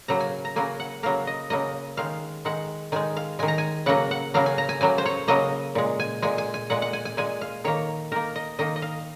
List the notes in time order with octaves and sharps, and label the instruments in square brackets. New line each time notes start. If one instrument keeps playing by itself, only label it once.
[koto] C#3 F#3 A#3 A#5
G#5
A#5
C#3 F#3 A#3 G#5
F#5
C#3 F#3 A#3 F5
D#5
C#3 F#3 A#3 D#5
D#3 G#3 F5
D#3 G#3 F#5
D#3 G#3 G#5
F5
D#3 G#3 G#5
A#5
G#5
C#3 F#3 A#3 F#5
F#5
C#3 F#3 A#3 F5
G#5
A#5
G#5
C#3 F#3 A#3 G#5
C5
C#5
C#3 F#3 A#3 D#5
A#2 G#3
G#5
A#2 G#3 G#5
G#5
G#5
A#2 G#3 F#5
F#5
G#5
G#5
A#2 G#3 G#5
F5
D#3 A#3 C#5
D#3 A#3 A#4
D#5
D#3 A#3 D#5
D#5
F5